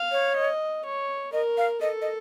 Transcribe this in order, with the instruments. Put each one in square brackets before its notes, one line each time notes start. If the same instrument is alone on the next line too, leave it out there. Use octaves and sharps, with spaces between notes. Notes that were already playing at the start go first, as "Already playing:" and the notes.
Already playing: [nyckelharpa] F5
[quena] C#5
[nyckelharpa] D#5
C#5
[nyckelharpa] A#4 [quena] D#5
[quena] F5
[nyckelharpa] A4 [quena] D#5
[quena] D#5